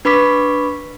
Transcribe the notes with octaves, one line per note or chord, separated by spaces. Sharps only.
D4 B4 B5 C#6 D6 B6